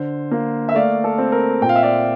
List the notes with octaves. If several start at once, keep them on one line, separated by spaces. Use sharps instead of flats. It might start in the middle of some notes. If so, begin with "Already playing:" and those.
Already playing: D3 C5
A#3
E5
A3 D5 F5
A4
C4
A#4
A#2 G5
F5
E5
D5 F5